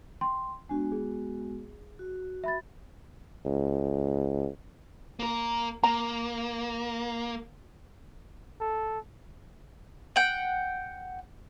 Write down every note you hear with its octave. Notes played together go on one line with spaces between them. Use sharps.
G5 C6
G#3 B3 D4 F#4 G#5
G#4
F#4
E5 B5 A6
C#2
A#3 A#4
A#3 A#5
A4
F#5 G5